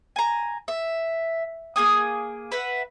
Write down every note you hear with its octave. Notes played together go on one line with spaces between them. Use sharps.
G#5 A#5
E5
A#3 G#4 G#5 D#6
B4 E5 F#5